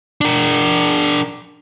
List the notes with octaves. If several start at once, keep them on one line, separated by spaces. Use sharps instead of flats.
D4 A#4